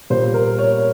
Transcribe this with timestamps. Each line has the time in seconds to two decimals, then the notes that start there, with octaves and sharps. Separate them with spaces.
0.10 A#2 G3 C5
0.34 A#4
0.58 C#5